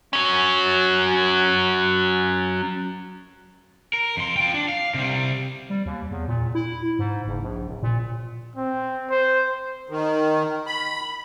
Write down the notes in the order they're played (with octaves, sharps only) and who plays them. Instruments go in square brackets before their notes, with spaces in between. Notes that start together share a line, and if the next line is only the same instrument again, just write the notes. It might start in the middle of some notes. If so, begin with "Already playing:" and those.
[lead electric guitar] F#3 C#4
[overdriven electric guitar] A#4
F2 C6
F4 G5
D4
F5
C3 G3
[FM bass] G3
D#2
E2
A#2
E4
G#2
F#1
A#1
D1
A#2
[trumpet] C4
C5
[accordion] D#3
B5